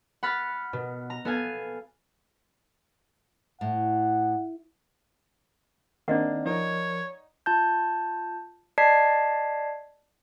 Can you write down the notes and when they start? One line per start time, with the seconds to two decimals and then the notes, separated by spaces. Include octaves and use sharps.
0.23 F#5 B5 F6 A6
0.73 B2
1.10 A#5
1.25 B3 A4 F5 G#5
3.61 A2 F#5
6.08 D#3 A#3 C4 D4 D#4 D5 D#5 F#5
6.46 F3 D#4 A#4 C#5
7.46 F4 A5 G6
8.78 D5 D#5 A5 G#6 B6 C7